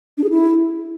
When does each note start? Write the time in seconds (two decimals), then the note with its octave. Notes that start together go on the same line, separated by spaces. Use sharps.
0.18 D4
0.24 G#4
0.30 E4